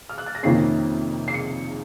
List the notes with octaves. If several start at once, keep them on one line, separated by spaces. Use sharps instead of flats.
F6
F#6
A6
A#6
F2 C3 D#3 A#3 C#4 C7
C7
C#7